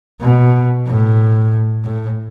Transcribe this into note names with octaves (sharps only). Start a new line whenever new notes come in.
B2
A2
A2